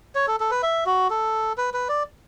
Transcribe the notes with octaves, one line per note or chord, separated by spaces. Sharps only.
C#5
A4
A4
B4
E5
F#4
A4
B4
B4
D5